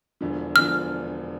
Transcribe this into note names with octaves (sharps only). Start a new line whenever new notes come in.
E1 E2 D3 F3
E1 E2 D3 F3 F6